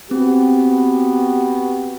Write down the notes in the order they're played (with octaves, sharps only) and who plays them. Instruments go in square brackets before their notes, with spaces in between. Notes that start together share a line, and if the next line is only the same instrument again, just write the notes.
[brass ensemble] B3 F#4 G4 [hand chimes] C4